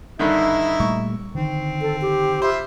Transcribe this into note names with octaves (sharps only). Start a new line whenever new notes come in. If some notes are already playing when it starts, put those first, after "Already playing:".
G2 D3 D#3 D#4 E4 E5
A#2 G3 A3 C#6
D3 D#3 C4
A4
G4
F4 C5 E5 B5